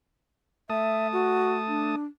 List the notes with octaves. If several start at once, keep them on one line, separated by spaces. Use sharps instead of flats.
A3 E5 A5 D#6
F#4
D4